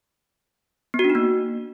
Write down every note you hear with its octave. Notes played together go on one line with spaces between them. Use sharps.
B3
F#4
D4
D#4
A#3